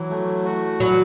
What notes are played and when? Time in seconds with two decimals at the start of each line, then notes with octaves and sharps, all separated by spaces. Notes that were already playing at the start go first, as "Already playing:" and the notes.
Already playing: E3 F#3
0.10 A3
0.45 F#4
0.80 F#3 B4